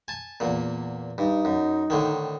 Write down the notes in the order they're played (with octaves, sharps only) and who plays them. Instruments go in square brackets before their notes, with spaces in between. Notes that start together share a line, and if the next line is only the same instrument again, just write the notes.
[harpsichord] G#5 A5
E2 A#2
[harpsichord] G2 [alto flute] D#4
[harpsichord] F#2
A2 D3 D#3